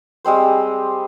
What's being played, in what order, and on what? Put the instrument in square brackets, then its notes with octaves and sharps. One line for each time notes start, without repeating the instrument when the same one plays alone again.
[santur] G3 G#3 C4 C5